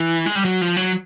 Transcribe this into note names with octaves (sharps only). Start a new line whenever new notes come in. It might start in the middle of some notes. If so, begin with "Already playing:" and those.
Already playing: E3
G#3
G3
F#3
F3
F#3